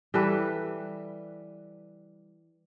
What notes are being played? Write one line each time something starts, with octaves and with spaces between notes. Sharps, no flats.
E3 G3 A4 B4